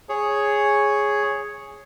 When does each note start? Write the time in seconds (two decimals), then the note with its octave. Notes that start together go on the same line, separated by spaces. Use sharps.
0.09 G#4 C#5